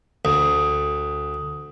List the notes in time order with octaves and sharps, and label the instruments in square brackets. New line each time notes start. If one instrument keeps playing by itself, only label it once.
[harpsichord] D2 [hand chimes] D#6